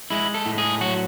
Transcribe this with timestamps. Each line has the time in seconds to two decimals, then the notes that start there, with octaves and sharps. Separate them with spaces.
0.10 G#3 E4
0.34 A4
0.46 A2
0.58 G#4
0.81 F#3 F#4